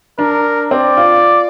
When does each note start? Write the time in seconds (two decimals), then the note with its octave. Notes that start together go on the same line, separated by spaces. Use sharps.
0.18 D4 A#4
0.71 C4 D5
0.97 F4